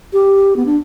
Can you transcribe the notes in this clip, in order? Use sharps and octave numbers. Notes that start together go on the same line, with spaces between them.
G4
B3
D4